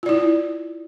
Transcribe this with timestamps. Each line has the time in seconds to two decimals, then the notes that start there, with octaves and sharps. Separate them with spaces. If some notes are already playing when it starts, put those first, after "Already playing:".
0.03 F4
0.06 D5
0.09 E4